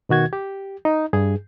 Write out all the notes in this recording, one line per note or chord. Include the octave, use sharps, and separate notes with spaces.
B2 D#3 F#4 G#6
G4
D#4
G2 G#4